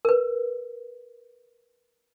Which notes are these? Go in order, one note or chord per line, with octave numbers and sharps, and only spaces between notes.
A#4 B4